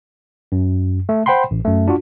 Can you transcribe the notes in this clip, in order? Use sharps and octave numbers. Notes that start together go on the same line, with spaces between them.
F#2
A3
C5 F#5 G5 B5 C6
A1
F#2 A3
D4 F4 F#4